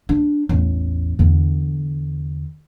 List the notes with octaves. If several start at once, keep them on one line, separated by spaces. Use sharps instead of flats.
D4
A1 E2
E2 D3